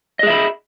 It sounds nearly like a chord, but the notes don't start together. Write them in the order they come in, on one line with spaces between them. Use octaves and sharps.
D#5 G#4 E5 B5